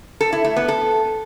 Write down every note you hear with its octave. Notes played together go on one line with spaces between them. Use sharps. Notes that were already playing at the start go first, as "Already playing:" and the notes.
A4
E4
A3
B3
A4